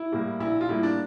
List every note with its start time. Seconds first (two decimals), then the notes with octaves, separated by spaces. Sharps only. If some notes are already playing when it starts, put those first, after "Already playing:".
Already playing: E4
0.12 A2 G3 A#3
0.40 A#1 E4
0.61 F4
0.68 A2 G3 A#3 E4
0.83 D4